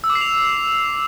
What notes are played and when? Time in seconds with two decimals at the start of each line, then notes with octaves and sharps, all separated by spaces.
0.04 E6
0.10 D6
0.15 C7
0.21 F7